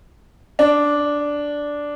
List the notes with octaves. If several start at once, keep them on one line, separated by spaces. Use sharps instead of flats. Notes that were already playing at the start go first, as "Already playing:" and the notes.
D4